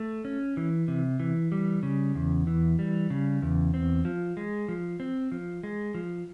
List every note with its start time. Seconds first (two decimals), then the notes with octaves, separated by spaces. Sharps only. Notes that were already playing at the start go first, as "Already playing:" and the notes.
Already playing: A3
0.25 C#4
0.57 E3
0.88 C3
1.20 E3
1.52 G3
1.83 C#3
2.15 E2
2.47 E3
2.79 G3
3.10 C#3
3.42 E2
3.74 C4
4.05 F3
4.37 G#3
4.68 F3
5.00 C4
5.32 F3
5.63 G#3
5.95 F3